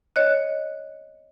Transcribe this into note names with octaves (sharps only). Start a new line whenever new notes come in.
C#5 D#5 F#6